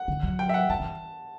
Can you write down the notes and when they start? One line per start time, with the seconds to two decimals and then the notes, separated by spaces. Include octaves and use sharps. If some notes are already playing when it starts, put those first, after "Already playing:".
Already playing: F#5
0.08 D3
0.23 F#3
0.39 G5
0.49 E5
0.54 F#5
0.70 F#3 A5
0.80 E3